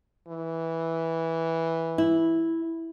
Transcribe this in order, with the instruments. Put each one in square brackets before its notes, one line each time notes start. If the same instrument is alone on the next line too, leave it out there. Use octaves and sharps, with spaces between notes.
[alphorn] E3
[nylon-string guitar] E4